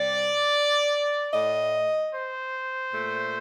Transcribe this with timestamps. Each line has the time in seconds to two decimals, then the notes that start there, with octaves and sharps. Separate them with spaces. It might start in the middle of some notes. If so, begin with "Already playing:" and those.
Already playing: C3 G3 D5
1.33 A2 A3 D#5
2.12 C5
2.92 A#2 A3